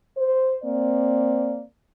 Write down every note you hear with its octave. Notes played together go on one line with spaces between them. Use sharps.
C5
A#3 C4 D5